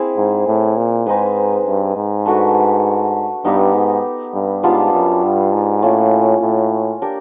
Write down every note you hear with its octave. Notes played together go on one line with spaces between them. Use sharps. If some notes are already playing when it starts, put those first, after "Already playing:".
Already playing: A#3 C4 E4 G#4
G#2
A2
A#2
G#2 C4 D#4 G#4 B4
G2
G#2
A3 D4 F#4 B4
G2 B3 D#4 G4
G#2
G2
G#2 G3 B3 D4 F4
F#2
G2
G#2
A2 A#3 C#4 F4
A2
D4 G4 A#4